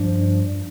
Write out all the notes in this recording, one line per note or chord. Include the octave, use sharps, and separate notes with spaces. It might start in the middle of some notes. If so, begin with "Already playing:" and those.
Already playing: G2 F3 D4